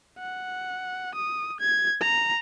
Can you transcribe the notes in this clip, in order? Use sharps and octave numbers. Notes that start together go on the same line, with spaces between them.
F#5
D#6
G#6
A#5